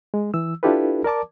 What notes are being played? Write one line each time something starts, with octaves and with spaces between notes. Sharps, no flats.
G#3
E3 E6
D4 E4 F4 G4 A4 B4
A#4 D5 A5 D6